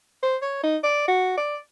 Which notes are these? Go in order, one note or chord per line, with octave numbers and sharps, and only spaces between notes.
C5
C#5
D#4
D5
F#4
D5